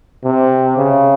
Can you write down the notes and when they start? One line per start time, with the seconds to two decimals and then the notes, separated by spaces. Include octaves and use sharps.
0.24 C3
0.77 C#3